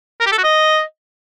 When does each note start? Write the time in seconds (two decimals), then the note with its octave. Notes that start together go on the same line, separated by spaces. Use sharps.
0.20 A#4
0.26 G4
0.32 A4
0.38 F#4
0.44 D#5